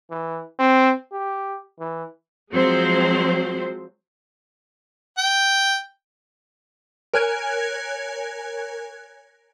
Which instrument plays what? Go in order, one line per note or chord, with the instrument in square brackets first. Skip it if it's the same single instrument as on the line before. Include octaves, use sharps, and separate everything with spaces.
[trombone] E3
C4
G4
E3
[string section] F3 F#3 G#3 C4 C5
[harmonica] G5
[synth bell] A#4 C#5 G#5 F#6 G#6